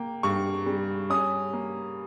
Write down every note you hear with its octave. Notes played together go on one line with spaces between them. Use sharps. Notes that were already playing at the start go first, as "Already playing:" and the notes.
Already playing: A#3 G5
G2 C#6
G3
C#4 D#6
A#3